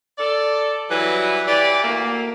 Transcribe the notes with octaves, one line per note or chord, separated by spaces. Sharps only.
A4 D5
E3 F#3 G3 F#4 B4
E3 G4 D5
D2 A3 A#3